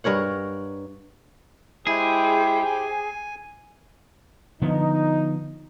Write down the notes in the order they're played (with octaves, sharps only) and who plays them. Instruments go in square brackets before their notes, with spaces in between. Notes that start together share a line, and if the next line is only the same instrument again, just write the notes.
[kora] G2 A#4 C#5 F#5
[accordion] G#3 E4 [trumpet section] G4 C5 G5 [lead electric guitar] G#4
[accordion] G#5
[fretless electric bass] D3 F3 B3 [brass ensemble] D#4